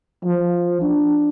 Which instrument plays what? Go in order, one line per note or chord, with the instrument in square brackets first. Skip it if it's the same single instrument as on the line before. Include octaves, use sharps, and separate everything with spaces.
[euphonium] F3
D4